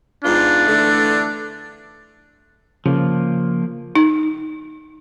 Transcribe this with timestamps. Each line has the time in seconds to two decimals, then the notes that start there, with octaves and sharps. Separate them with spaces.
0.24 G#2 B3 D4 F4
0.66 D3 E3 A3
2.86 C#3 F3 A#3
3.95 D#4